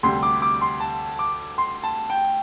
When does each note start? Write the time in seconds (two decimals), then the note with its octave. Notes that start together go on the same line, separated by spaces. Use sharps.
0.03 D2 C3 G3 C6
0.23 D6
0.42 D6
0.61 C6
0.80 A5
1.19 D6
1.58 C6
1.83 A5
2.10 G5